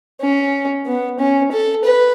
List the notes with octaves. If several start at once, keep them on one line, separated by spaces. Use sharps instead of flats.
C#4
B3
C#4
A4
B4